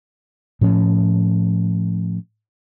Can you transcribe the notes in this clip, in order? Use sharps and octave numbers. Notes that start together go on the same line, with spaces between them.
A2 F3 C#4